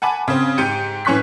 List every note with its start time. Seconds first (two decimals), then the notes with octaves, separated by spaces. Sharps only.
0.02 F#5 G#5 A5 B5 D6
0.28 C#3 C4
0.58 G#2 G4 G5 G6 C#7 D#7
1.05 A2 E3 C#4 C#6 F#6 B6